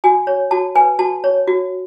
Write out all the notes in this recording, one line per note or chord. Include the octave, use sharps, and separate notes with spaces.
F#4 G#5
C#5
F#4 A5
B4 G#5
F#4 A5
C#5
F#4